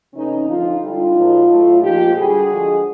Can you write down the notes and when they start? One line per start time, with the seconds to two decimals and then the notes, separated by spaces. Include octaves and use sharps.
0.14 C3 E3 A3 C#4 D#4
0.48 D3 F3 G#3 D#4 F4
0.81 D3 G3 D#4 F4
1.15 B2 F#3 A3
1.49 A2 F#3 A3
1.82 A#2 F3 G#3 F4 G4
2.15 D3 G3 F#4 G#4
2.49 D3 F3 G#3